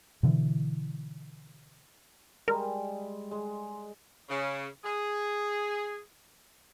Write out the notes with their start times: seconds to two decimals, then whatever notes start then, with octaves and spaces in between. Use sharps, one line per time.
0.23 B2 D3 E3
2.48 G3 G#3 A#4
3.31 G#3
4.29 C#3
4.84 G#4